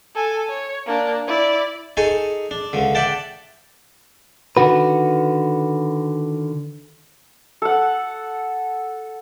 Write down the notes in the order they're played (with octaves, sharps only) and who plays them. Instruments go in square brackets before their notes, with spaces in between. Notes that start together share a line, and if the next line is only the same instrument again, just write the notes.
[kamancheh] A4 G#5
C#5
A#3 D4
E4 D5
[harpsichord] D#4 G#4 A4 G#5 C#6
D4
C#2 D3
D5 E5 F#5 G5 A5
[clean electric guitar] D3 D#3 F#4 B4
[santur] A4 F#5